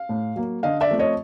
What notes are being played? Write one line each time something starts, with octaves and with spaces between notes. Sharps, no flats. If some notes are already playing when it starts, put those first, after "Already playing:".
Already playing: F5
A2
F#3 A#3
D3 D#5 F5
D5 E5
F3 A3 C4
C#5 D#5